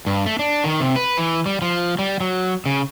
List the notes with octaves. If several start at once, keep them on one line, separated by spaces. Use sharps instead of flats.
G2
A3
D4
D#3
C3
B4
E3
G3
F3
G3
F#3
C#3